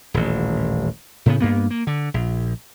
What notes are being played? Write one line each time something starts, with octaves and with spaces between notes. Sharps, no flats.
D#1 A1
A2 C#3 B3
G2 A#3 B3
A#3
D3
A#1